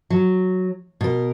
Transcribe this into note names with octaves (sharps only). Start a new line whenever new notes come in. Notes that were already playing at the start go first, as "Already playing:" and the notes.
F#3
B2 A#4